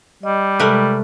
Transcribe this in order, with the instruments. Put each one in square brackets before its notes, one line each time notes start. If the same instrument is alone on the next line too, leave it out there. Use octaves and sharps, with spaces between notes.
[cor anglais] G3 [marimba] D#5
[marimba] C3 G#3 [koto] A3 A#4 B4